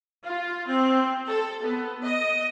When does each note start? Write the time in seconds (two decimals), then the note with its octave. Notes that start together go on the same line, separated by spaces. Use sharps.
0.22 F4
0.68 C4
1.27 A4
1.64 B3
2.02 D#5